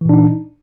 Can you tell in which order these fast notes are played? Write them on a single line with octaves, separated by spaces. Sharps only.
E3 A#2 D4 D#4